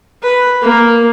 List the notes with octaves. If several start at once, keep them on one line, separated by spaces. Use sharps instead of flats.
B4
A#3